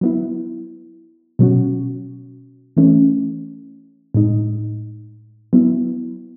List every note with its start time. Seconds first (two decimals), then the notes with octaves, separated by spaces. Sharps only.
0.01 F#3 B3 E4
1.39 B2 F#3 C#4 F#4
2.77 E3 A3 C#4
4.14 A2 G#3 D#4
5.53 F#3 B3 E4